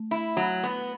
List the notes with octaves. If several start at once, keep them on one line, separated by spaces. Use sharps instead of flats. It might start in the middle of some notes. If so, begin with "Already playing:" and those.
Already playing: A3
E4
F#3
B3